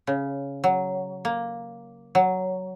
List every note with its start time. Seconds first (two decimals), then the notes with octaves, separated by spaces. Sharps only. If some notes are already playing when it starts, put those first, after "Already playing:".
0.07 C#3
0.64 F#3
1.25 A#3
2.15 F#3